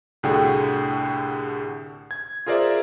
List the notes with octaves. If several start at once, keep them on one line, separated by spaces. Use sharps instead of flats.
C2 A2 D3 F#4 G#4 G5
G#6
F4 G#4 A#4 C5 D5 E5